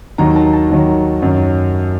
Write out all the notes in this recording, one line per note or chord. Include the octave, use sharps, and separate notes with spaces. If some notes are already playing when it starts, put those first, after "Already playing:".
D#2 D#3 F#3 A#5
A5
A5
D#2 D#3 F#3
F#2 D#3 F#3